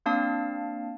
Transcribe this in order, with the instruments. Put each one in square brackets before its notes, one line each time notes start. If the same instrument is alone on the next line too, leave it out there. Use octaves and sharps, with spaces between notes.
[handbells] A#3 C4 D4 F5 A5